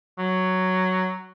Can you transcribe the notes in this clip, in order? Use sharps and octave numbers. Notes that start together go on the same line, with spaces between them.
F#3